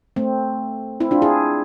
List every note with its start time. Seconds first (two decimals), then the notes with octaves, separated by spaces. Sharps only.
0.16 A3 C4
1.00 C4 E4
1.11 D4 F4
1.22 E4 G#4